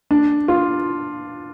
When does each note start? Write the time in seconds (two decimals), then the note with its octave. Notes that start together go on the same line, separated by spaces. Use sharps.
0.11 D4
0.48 F4